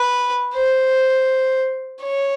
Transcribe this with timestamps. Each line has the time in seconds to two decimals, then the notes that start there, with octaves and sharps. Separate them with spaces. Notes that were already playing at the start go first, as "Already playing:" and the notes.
Already playing: B4
0.54 C5
2.03 C#5